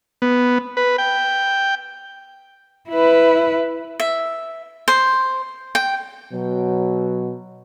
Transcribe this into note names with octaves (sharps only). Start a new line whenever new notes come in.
B3
B4
G5
E4 B4
E5
C5
G5
B2 F#3